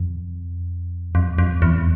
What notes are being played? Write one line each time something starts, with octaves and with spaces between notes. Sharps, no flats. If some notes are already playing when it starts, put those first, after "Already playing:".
Already playing: F2
F2
F2
E2